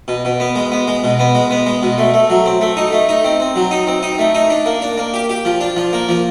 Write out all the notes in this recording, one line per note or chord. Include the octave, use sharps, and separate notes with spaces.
B2
B2
B3
G#3
B3
G#3
B2
B3
G#3
B3
G#3
B2
A3
A3
F#3
C4
A3
D#4
A3
D#4
C4
C4
F#3
D#4
C4
D#4
A3
D#4
D4
A#3
D4
A#3
G4
G4
F3
D4
F3
A#3
F3